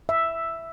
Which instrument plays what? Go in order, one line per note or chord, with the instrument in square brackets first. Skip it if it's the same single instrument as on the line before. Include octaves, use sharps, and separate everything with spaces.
[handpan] E5